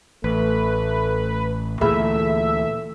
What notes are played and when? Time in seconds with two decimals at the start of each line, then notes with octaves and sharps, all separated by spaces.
0.24 A1 A3 B4
1.81 D2 A#2 E3 A3 G#4 A4 E5 B5